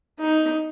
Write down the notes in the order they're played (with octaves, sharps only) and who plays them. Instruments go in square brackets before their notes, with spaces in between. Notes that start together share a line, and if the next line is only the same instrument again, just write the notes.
[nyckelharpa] D#4